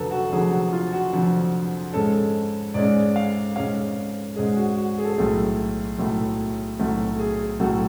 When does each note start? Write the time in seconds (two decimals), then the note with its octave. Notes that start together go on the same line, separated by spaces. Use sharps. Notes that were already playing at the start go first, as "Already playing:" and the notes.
Already playing: F1 F2 D3 F#3 A4 B4
0.11 F#4
0.32 F1 F2 D3 F#3 G#4
0.52 F#4
0.73 F4
0.93 F#4
1.12 F1 F2 D3 F#3
1.93 G#2 G#3 C#4 A4
2.74 G#2 G#3 C#4 D5
3.16 F5
3.56 G#2 G#3 C#4 F5
4.36 G#2 G#3 C#4 G#4
4.56 F#4
4.77 F#4
4.98 G#4
5.05 A4
5.12 G#4
5.18 B1 A2 F#3 A3
5.98 B1 A2 F#3 A3
6.79 B1 A2 F#3 A3 F#4
7.19 G#4
7.60 B1 A2 F#3 A3 F#4